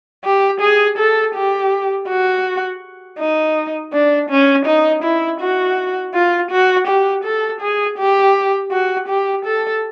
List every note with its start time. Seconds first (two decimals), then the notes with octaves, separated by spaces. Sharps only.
0.24 G4
0.61 G#4
0.98 A4
1.35 G4
2.09 F#4
3.19 D#4
3.93 D4
4.30 C#4
4.66 D#4
5.03 E4
5.41 F#4
6.14 F4
6.51 F#4
6.87 G4
7.24 A4
7.61 G#4
7.98 G4
8.72 F#4
9.09 G4
9.45 A4